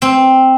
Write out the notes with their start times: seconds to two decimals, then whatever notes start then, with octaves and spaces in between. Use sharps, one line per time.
0.02 C4